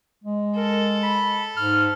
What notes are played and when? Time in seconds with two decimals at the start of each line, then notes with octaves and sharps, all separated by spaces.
0.24 G#3
0.56 A4 A#4
1.03 B5
1.57 G#2 F6